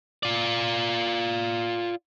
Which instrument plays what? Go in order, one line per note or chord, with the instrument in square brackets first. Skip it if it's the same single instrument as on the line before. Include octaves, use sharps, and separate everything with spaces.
[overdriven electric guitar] F4 D5